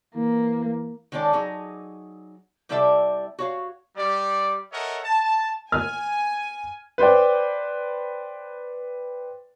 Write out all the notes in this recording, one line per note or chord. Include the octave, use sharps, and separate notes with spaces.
E3 A#3
D#3 G#3 C#4 A4 D5
F#3 D#4 G#4
C3 G3 E4 A4 D5 E5
F#4 C#5 F5
G3 D5
A4 A#4 C#5 D#5 E5 F#5
A5
G#5 F6
B4 C5 D5 G5